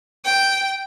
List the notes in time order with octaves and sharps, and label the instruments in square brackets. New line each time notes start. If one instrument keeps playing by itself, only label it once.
[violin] G5